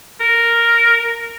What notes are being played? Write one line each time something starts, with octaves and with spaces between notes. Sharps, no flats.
A#4